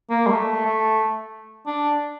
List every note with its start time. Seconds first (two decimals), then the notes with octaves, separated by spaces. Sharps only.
0.10 A#3
0.27 G3
0.32 A3
0.65 A3
1.67 D4